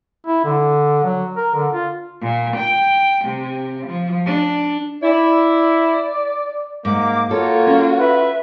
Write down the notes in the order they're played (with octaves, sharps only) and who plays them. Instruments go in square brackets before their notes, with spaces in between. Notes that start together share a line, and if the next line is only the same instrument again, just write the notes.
[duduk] E4
D3
F#3
A#4
D3
F4
[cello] A#2
G5
C3
F3
D4
[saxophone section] E4 [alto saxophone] D5
[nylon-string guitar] G#2 [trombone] A#3 [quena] D6
[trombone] A#3 [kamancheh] F4 F#4 [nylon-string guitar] A4 [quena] C#5
[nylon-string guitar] C#4
[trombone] B4 [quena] E5